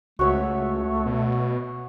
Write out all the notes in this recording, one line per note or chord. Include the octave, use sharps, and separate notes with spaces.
C#2 A3 F#4 C#5 E5
B2